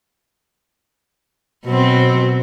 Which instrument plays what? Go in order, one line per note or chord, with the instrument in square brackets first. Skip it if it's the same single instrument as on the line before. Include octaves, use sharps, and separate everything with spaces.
[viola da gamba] B2 F#3 C4